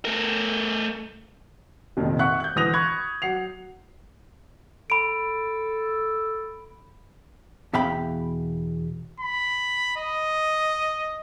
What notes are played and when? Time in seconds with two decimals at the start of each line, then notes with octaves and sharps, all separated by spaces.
0.05 A3 A#4
1.97 F1 F2 A#2 D#3
2.19 E5 F#5 C#6 F#6
2.40 F#6 G6
2.56 D2 E3 D#6 A#6 F7
2.73 B5 C#6 F#6 G#6
3.22 F#3 F#5 C7 F7
4.90 A4 B5 D7
7.73 E2 B2 E5 F5 G5 B5
9.20 B5
9.97 D#5